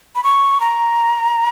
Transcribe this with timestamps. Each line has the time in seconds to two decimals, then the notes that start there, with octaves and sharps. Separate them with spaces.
0.15 B5
0.24 C#6
0.60 A#5